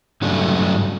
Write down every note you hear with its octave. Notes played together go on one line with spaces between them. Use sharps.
G2 C#3 F#3 A3 D4